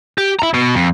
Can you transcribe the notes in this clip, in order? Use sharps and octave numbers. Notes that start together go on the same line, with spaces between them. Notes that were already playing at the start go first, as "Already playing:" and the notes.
G4
E4 A#5
B2
F2